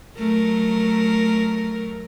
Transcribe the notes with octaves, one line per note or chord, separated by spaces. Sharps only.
F#3 A3 A#4